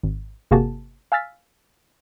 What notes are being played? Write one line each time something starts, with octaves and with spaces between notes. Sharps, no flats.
G#1
G1 C3 A#3 F#4 G#4 A5
F5 G#5 E6 F6 A6 B6